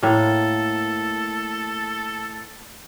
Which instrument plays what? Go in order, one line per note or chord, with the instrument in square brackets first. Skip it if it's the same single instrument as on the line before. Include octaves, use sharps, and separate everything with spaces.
[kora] A2 A#3 [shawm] A4